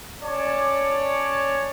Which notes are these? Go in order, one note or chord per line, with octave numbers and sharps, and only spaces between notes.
C#4 C#5 D5 A5